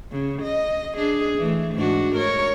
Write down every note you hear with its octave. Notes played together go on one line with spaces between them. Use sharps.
C#3
D#5
D4 G#4
E3 A3
G#2 D4 F#4
A#4 C#5